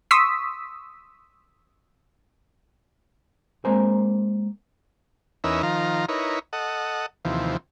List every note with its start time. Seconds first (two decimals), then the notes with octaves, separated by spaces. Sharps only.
0.11 C6 C#6 D#6 E6 B6
3.65 G#3 A#3 C4 A#4 C5 G#5
5.44 E2 C#4 D#4 A#4 B4 E5
5.63 D#3 F3 F4 A#5
6.09 D#4 E4 A#4 B4 C#5
6.53 A4 D#5 F#5
7.25 D#2 C3 E3 F3